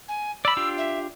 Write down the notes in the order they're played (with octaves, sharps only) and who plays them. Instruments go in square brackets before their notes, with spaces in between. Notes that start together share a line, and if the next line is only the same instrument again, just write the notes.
[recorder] G#5
[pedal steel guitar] D5 B5 [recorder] E6
[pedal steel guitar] D4 F4 G4
[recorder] E5